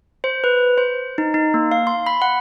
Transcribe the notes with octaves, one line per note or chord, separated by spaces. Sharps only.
C5
B4
C5
D#4
D#4
A#3
F5
C6
B5
F#5